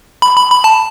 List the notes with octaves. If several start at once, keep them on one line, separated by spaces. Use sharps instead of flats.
B5
B5
B5
A5